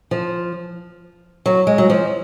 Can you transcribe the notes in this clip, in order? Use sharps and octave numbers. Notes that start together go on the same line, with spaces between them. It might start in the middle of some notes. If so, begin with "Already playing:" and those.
F3
F#3
G#3
F#3
F3